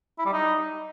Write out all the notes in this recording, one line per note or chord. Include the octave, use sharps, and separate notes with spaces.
E4
G3
D#4